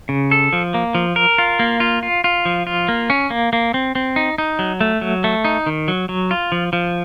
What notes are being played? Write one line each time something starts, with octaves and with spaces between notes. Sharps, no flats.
C#3
A4
F3
A#3
F3
A#4
F4
A#3
F4
F4
F4
F3
F4
A#3
C#4
A#3
A#3
C4
C4
D#4
D#4
F#3
A3
F#3
A3
D#4
D#3
F#3
F#3
F4
F3
F3